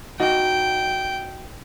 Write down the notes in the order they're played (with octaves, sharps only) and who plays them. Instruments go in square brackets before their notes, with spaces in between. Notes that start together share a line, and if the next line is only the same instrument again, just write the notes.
[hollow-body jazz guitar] D#4 F#4 [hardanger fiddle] G5